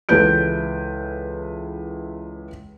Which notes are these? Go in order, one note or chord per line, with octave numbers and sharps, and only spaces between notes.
C#2 E3 A4 B4 G6 D7